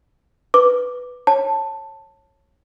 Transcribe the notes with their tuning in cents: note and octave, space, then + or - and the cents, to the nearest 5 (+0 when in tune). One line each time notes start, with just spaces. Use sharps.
B4 +0 D6 +0
C#5 -20 A5 +5